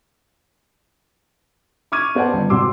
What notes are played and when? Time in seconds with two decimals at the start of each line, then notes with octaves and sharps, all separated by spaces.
1.92 C#6 D6 F6 G#6 D#7
2.15 B3 C5 D5 F#5 A5
2.34 G1
2.49 G#1 C3 F#4 C6 D6 E6